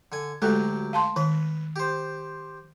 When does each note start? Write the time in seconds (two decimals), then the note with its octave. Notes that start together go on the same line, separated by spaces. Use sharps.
0.12 D3 G#5
0.42 D2 F#3 G#3 A3 G4 A4
0.93 F5 A5 C6
1.16 D#3 B4
1.76 G4 C5